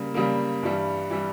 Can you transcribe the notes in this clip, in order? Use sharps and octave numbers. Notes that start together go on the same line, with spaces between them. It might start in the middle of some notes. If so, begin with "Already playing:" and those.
Already playing: C#3 G3 A#3
C#3 G3 A#3
G2 E3 G3
E3 G3